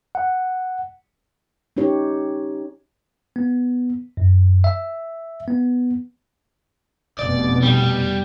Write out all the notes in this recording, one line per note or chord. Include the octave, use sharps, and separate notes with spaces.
F#5
C#4 D#4 G4 C#5
B3
F#2
E5
B3
F1 F2 B2 D5
G3